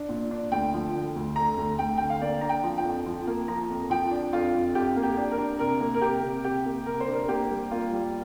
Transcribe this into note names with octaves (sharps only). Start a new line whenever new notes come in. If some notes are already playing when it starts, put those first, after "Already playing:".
Already playing: D4
A#2
D4
D2 G5
F3
D3
D2
D3 A#5
D2
D2 G5
D3 G5
F5
A#3 D5
D4 A#5
G5
F3
G5
F2
F3
A#3
F3 A#5
F2
F3 G5
D4
F2 F4
F2
F2 G4
A#3
G4
D4
A#4
D4
C3 A#4
A#3
A#4
C3 G4
C3
C3 G4
A#3
C3 A#4
C5
D4
A#4
A#3 G4
G3
A#3 F4
G3